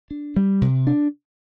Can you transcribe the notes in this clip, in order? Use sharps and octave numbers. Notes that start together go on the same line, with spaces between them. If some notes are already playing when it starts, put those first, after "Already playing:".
D4
G3
C3
D4